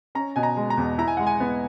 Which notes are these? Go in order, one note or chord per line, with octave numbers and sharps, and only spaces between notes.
C#4 A#5
B2 G#5
A#5
G#3
A#5
E2
E4 A#5
G#5
G#3 F#5
G#5
B3